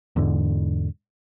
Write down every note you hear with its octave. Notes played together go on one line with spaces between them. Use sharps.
E2 G#2 D3